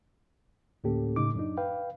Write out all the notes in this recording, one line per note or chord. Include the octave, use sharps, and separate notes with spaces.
D2 A2 A#3 C#4 G4 A4
A2 C#3 D#4 D6
F#2 D4 D#4
B4 F5 G5